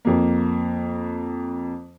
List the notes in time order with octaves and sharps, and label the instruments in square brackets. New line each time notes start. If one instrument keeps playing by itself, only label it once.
[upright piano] F2 A#3